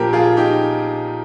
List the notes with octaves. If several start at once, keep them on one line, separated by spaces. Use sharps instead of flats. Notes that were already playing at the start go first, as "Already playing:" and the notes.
Already playing: A#1 A#2 F3 G4 A#4
F4 G#4
D#4 G4